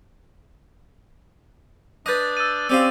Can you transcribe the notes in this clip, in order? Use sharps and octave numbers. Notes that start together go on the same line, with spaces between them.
D4 B4 D#5 D#6 G6 A6
E6 D#7
C4 C#4 G4 D5 F5